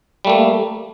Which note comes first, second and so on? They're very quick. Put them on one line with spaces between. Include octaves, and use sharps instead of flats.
G3 A3 A#3